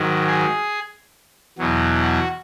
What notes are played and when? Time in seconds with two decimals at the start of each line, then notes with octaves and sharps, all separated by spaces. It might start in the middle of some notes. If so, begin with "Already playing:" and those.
Already playing: G#2 D#3 F#3
0.28 G#4
1.58 E2 B2 F#3
2.02 F#4